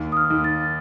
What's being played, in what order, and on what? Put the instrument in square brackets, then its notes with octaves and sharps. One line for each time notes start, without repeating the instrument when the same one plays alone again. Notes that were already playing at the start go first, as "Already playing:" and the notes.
Already playing: [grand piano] D#2
[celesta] D#6
F6
[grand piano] D#2
[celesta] A6